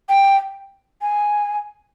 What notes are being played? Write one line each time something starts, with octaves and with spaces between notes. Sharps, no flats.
G5
G#5